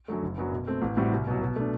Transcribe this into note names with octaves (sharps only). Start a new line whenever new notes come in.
F#2 D3 F#3 A3
F#1
F#2 F#3 B3 D4
B2
A3 C4
A1
A2 G3 C4 F#4
C2
B2 F#3
B2
A3 D4